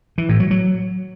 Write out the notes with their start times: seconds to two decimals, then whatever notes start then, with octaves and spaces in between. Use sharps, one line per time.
0.18 E3
0.29 A2
0.40 F#3
0.51 F#3